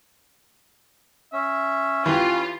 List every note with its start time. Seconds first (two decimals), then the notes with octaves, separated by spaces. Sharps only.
1.33 C#4 E5
2.06 E3 F4 G4 B4